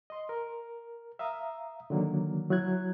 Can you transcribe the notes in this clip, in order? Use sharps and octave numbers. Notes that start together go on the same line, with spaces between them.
D#5 C6
A#4
E5 F5 A#5 D#6
D3 D#3 F#3 A#3
F#3 E4 F#6 G#6